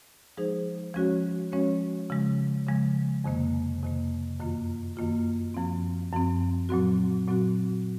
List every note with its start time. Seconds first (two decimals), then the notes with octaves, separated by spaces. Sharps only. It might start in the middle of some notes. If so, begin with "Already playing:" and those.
0.37 F3 G#3 D#4 G#4 C5
0.94 F3 G#3 C#4 F#4 C#5
1.52 F3 G#3 C#4 F#4 C#5
2.10 C#3 F3 G#3
2.67 C#3 F3 G#3
3.24 F2 C3 D#3 A#3
3.82 F2 C3 D#3 A#3
4.40 F#2 D#3 A#3 F4
4.97 F#2 D#3 A#3 F4
5.54 F#2 F3 C4
6.12 F#2 F3 C4
6.69 A#2 F#3 C4 F#4
7.27 A#2 F#3 C4 F#4